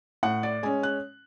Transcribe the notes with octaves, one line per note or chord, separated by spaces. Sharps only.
A2 F#5
D5
G#3 C#4 G#5
F#6